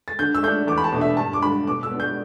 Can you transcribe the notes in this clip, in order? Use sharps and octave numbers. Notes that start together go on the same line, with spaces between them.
A6
D3 G6
E6
A3 D4 G6
E2 D6
B5
A5
B2 A3 D4
E5
G2 A5
D6
D3 G3 B5
B2 D6
E6
B3 D4
G6